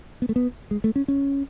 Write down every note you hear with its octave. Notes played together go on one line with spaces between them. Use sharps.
B3
A3
B3
G#3
A3
C#4
C#4